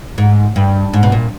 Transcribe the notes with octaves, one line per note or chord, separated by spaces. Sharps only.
G#2
G2
G#2
B2
A#2